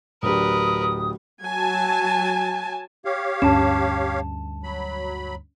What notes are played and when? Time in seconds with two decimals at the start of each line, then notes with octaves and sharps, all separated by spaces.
0.23 D1 D4 G4 A#4 B4 D#6
1.43 F#3 G#5 A5
3.05 G4 C#5 F5
3.42 D2 G2 C#4 A5 E7
4.64 F#3 B5